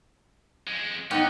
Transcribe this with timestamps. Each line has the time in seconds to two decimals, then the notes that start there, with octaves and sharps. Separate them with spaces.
0.67 F2 G#3
1.11 G#2 B3 C#4 D#4 G5